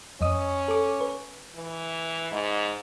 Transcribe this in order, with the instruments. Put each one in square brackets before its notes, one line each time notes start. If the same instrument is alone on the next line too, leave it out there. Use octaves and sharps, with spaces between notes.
[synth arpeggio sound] F2 D#5 D#6 [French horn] C#4
[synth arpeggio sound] A4 D6
B4
[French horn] E3
G#2